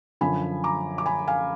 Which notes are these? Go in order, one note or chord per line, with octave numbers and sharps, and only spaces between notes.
F#2 D3 F3 G#5 B5
A#5 D6
D6
G#5 B5
F5 G#5